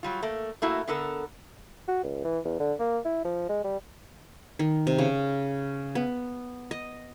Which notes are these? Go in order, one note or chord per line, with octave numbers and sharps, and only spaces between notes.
F#3 G3 F4
A3 A#3
A3 A#3 E4 F#4
D3 B3 A4 A#4
F#4
C#2
E3
E2
D3
A#3
E4
F3
G#3
G3
D#3
C3
C#3
B3
D#5